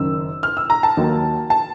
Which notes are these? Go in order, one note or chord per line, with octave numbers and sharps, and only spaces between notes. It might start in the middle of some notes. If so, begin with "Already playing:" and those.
Already playing: F#1 F#2 D#3 E6
F6
E6
A#5
A5
D#2 D#3 F#3 A#3 D#4
A5